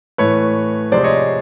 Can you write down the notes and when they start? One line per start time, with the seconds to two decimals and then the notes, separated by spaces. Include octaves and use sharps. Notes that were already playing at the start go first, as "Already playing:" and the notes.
0.18 A2 E3 A3 B4 C#5
0.92 C3 F3 G#3 C5 D5
1.04 C#5 D#5